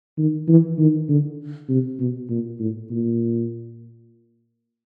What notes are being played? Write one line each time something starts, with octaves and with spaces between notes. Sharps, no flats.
D#3
E3
D#3
D3
C3
B2
A#2
A2
A#2